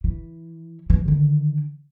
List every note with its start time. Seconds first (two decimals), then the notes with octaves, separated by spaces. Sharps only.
0.04 E3
0.90 E3
1.06 D3 D#3